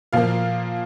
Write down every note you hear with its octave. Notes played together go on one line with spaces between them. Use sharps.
A#2 F3 A#3 F5